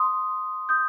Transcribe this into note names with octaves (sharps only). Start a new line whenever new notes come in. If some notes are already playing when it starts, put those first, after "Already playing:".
Already playing: C6 D#6
D#6 G6